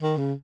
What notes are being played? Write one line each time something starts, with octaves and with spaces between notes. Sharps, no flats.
D#3
C#3